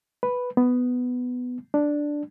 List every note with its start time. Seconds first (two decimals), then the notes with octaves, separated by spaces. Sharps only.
0.23 B4
0.57 B3
1.74 D4